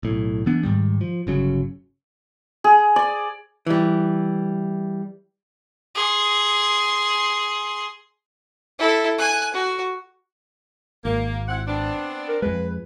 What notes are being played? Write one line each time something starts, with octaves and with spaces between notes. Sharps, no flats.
B1 A2
E3 B3 D4
G#2 D#3 G3
F3
G1 C#3 F#3
G#4
D5
E3 G3
G#4 C6
E4 A4
G#5 F#6
F#4
G#1 A#3
C4 E4 F#5
B3 C4 D4
A#4
F2 G#3 B4